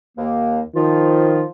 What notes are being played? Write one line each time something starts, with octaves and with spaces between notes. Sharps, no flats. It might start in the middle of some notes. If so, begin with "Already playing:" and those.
D#2 A#3
D#3 F3 F4